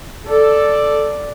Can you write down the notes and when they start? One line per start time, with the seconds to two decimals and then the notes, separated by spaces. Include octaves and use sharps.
0.28 A4 D5